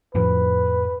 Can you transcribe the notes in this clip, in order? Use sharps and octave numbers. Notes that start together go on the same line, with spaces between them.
F2 A2 F3 B4